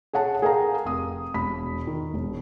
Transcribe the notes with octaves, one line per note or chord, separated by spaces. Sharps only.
G#4 C#5 F#5 A5
G#4 A#4 F5 G5 A5 A#5
F1 D#6
E1 B5 B6
D#3
E1